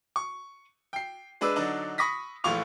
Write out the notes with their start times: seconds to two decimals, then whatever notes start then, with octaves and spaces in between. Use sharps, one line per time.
0.16 C#6
0.93 G5 C7
1.41 G#3 D4 B4 D6 E6
1.56 D3 F#3 D4 D#4 D5
1.98 B5 C#6 D#6 A#6 B6
2.44 A#1 E3 A3 F4 C#6 F7